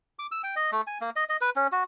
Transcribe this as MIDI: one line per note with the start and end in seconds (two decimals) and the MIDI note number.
0.19 0.27 86
0.31 0.42 88
0.44 0.55 79
0.56 0.71 75
0.72 0.81 57
0.87 0.98 80
1.01 1.10 58
1.16 1.24 75
1.29 1.37 75
1.41 1.50 71
1.56 1.67 61
1.72 1.84 66